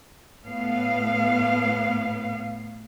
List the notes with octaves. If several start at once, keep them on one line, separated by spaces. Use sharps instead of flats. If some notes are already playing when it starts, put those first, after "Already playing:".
A2 A3 B3 F5